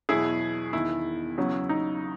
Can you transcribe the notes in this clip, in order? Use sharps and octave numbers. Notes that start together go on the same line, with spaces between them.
E2 B2 F#3 E4 G#4
E1 E2 D#3 E4
E2 C#3 F#3
D#4